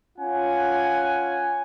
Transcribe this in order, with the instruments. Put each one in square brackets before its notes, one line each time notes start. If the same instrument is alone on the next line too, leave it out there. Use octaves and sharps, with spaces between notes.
[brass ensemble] C#4 F4 F#5 G#5